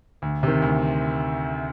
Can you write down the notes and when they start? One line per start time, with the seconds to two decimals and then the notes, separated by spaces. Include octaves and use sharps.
0.22 D2
0.43 C3 D#3
0.62 D2